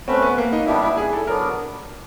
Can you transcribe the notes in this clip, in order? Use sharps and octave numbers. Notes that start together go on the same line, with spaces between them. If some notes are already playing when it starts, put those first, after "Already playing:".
A3 C4 C#4 F#4 B4
B3
A#3
D#4
G3 B3 D4 E4 G4
E4
G#4
A4
F#3 B3 D4 A#4